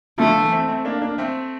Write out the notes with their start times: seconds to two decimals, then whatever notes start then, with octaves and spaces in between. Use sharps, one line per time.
0.18 D3 F3 A3
0.29 D3
0.41 E3
0.52 A3 C4
0.68 A3 C4
0.85 A#3 D4
1.02 A#3 D4
1.18 A3 C4